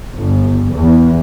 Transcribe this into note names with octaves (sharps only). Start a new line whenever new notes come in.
G1
E2